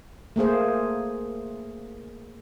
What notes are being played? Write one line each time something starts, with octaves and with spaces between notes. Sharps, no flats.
A3 A#3 G#4 C5